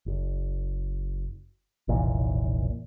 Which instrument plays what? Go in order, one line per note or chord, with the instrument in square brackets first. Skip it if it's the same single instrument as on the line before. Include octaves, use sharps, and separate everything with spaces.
[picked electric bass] F#1
F1 B1 A#2 E3